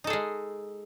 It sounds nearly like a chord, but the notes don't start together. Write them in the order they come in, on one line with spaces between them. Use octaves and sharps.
D#4 A4 G#4 G#3